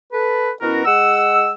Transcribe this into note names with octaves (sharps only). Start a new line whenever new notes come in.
A4 B4
B2 B3 C#4 E4 F#4 A#4
G#3 F#5 E6